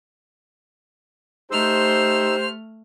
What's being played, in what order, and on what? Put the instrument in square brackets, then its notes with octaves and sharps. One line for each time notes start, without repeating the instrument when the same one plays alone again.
[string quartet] A3 F6 [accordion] D#4 E6 [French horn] G4 [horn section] C5